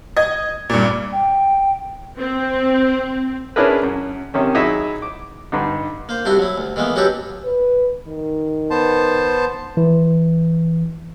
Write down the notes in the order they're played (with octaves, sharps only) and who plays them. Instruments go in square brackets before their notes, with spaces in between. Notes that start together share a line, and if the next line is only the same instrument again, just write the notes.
[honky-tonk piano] D#5 G#6
G2 A#2
[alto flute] G5
[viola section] C4
[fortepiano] C#4 D4 E4 G#4 A#4 B4
F#2
C3 D#3 C#4
F#3 D#4 E4 G#4 D#5 E5
D6
G2 D3 D#4
[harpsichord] A#3 C5
C2 C3 D4 E4 F#4 C6
F#3 E4
D2
D#3 E3 G#3 A#3 B3
F#3 C#4 F#4 G4 A4 B4
[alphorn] B4
D#3
[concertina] B3 C5 A5
[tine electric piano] E3